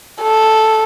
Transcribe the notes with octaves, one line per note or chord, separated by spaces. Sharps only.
A4